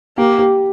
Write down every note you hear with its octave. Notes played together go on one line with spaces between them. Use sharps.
A#3 G4
G4